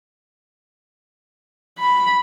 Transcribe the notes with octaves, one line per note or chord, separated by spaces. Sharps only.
B5